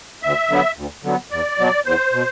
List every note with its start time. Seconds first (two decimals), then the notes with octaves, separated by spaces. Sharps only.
0.23 D2 E5
0.50 D3 F#3 B3
0.77 D2
1.04 D3 F#3 B3
1.31 E2 D5
1.58 B2 F#3
1.85 E2 C5
2.13 B2